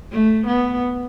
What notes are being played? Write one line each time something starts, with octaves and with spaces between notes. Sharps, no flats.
A3
B3